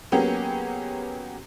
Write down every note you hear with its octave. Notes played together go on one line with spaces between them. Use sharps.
F#3 A#3 B3 C#4 G4 G#4